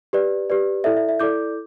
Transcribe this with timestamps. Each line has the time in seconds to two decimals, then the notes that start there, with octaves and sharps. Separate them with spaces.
0.13 G4 B4 D5
0.50 G4 B4 D5
0.84 E4 A4 D5 E5
0.96 E5
1.09 E5
1.20 E4 A4 D5 D6 G6